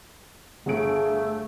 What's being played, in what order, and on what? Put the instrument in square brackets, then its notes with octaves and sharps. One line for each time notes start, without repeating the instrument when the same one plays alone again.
[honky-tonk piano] G1 G#4 D7 [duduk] A3